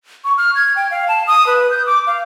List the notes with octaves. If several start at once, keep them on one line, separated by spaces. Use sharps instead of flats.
C#6
F6
G#6
G5
F5
A5
D#6
B4
G6
D6
F5